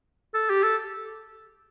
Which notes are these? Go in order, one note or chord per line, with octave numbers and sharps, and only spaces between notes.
A4
G4
A4